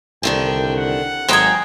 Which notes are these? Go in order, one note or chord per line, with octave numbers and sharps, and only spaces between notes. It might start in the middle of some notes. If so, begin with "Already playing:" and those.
C2 D3 D#3 D4 G5
F#5
G#1 F#3 C5 D#5 G5 G#5 A#5